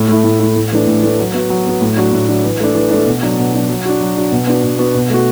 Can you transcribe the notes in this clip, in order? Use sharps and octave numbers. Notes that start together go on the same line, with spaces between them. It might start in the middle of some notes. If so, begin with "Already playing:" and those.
Already playing: A2
A3 E4
A2
A3 E4
A2
E3 A3 D4
A2
E3 A3 D4
F#3
B3 F#4
F#3
B3 F#4
A2
F#3 D4 F#4
A2
F#3 D4 F#4
E3
A3 D4
E3
A3 D4
B2
F#3 D4
B2
F#3 D4
F#3
D4 F#4
F#3
D4 F#4
B2
B3 D4 F#4
B2
B3 D4 F#4
B2
A3 F#4